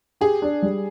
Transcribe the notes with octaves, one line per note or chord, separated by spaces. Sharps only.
G4 G#4
D4
G3